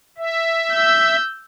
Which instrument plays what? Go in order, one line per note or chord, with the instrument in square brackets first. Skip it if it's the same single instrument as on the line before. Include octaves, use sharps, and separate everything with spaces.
[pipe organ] E5
[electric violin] E6 G6